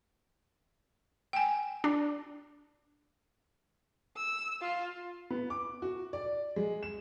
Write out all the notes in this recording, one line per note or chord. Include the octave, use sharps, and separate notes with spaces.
G5 G#5
D4
E6
F4
B3
D6
F#4
D5
G#3
E7